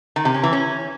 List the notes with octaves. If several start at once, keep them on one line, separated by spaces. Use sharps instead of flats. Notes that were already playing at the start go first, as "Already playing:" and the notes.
D#3
C3
C#4
E3
C#4